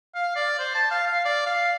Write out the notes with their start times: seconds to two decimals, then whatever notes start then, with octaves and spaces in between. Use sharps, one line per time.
0.15 F5
0.36 D5
0.59 C5
0.75 A5
0.91 F5
1.07 F5
1.25 D5
1.46 F5